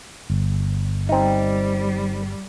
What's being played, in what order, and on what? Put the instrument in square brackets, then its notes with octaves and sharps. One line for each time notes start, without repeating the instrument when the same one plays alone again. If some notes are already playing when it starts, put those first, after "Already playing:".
[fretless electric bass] G1
[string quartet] G3 [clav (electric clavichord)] C4 D#4